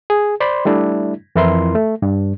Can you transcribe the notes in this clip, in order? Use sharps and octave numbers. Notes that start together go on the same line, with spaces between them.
G#4
C5 D5 B5 C6
G3 A3 D4 E4
F2 E3 E4 A#4 C6
A3
G2 D4